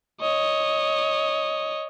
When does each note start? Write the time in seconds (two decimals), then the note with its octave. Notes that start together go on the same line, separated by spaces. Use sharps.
0.21 C#5 D#5